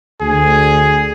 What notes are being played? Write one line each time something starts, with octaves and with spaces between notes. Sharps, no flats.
D2 G#4